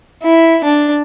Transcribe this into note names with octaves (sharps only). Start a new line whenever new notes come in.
E4
D4